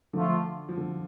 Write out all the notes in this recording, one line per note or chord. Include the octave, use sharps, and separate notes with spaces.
D3 F3 A3 F4
F3
D3